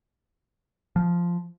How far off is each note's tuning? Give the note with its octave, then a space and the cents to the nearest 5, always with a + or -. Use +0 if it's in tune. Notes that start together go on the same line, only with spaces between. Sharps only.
F3 -5